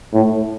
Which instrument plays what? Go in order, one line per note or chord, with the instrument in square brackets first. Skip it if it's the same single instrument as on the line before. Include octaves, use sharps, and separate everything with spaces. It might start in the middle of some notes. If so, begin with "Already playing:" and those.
[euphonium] A2